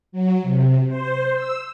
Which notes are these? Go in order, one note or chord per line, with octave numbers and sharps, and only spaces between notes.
F#3
C3
C5
E6